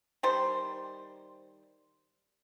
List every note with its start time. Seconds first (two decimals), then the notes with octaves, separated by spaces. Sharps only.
0.23 D#3 G3 C5